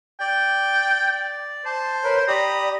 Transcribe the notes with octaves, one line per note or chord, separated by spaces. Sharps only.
D5 G5
C5 A5
A#4 B4 C#5
G4 D5 A#5 B5 D#6